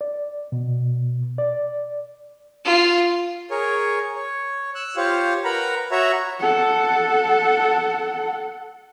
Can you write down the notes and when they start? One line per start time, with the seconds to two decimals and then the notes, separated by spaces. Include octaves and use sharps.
0.01 D5
0.52 B2
1.38 D5
2.65 F4
3.51 G#4 A#4 C#5
4.16 C#5
4.75 E6 F#6
4.96 F4 G4 C5 C#5 F5
5.44 A#4 B4 F#5 A#5 B5
5.91 F#4 C#5 E5 A#5
6.40 A4 F#5